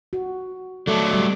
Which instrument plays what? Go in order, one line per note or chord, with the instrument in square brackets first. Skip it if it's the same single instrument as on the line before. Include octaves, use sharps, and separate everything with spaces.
[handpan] F#4
[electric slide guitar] F#3 A3 [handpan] A4 [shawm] D5
[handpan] G3